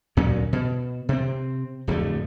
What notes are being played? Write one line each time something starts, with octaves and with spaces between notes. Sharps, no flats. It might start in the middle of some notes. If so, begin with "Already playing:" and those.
D2 A#2 F#3 C#4
B2
C3 C4
D1 F2 D3 A3